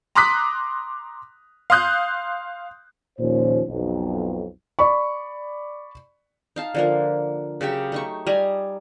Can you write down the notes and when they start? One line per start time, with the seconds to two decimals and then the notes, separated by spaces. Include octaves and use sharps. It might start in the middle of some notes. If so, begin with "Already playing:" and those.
0.15 A#5 C6 D6 D#6 F#6 B6
1.70 F5 C6 D#6 F#6 G6
3.19 D#2 A#2 F3 C#4 C5
3.67 B1 F2
4.79 D5 B5 C#6
6.56 D#4 F5 A5
6.75 D3 F3 A#3
7.61 C#3 F#3 G4 E5
7.92 A3 D#4 C#6
8.27 G3 D#5 G#5 A#5